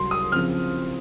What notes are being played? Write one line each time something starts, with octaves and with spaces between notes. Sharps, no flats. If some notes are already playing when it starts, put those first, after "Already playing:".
Already playing: C2 F#3 C6
D#6
C#3 F3 C4 F4 F6